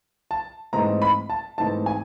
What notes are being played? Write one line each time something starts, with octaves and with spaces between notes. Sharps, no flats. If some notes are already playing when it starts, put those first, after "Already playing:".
A5
G#2 E3 A3 C4 D#4 A#5
B5
A5
G#2 E3 A3 C4 D#4 A5
G#5